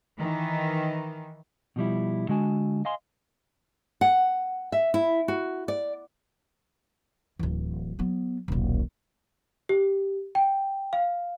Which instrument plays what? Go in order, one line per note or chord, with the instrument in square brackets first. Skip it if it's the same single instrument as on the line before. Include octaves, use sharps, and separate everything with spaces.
[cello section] D#3 E3
[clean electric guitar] B2 F3 G3 E4
D3 G#3 F#4 G#5 A5
D#5 F5 G#5 C6
[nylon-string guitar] F#5
E5
E4
F#4
D5
[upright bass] D1 E3
F#3 B3
D#1 B1
[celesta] G4
G5
F5